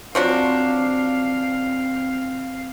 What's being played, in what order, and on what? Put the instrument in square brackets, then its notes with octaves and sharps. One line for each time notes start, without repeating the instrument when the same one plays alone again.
[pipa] F3 F#3 D4 [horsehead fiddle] C4 F5